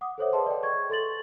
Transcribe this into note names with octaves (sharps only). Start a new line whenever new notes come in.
F#5 D6 D#6
A4 C5 C#5 E5
G#4 B4 D#5 A5 C6
D5 G5
C#6 G#6
A4 C6 A6 F#7